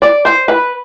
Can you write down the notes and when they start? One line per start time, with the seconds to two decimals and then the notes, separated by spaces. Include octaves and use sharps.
0.02 D5
0.25 C5
0.48 B4